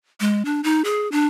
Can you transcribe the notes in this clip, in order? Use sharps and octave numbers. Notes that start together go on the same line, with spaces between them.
G#3
D4
D#4
G#4
D4